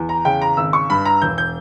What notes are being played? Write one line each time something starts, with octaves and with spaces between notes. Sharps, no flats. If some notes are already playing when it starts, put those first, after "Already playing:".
Already playing: E2
A#5
C#3 G5
A#5
G#1 E6
C#6
G2 B5
A#5
E1 G6
G6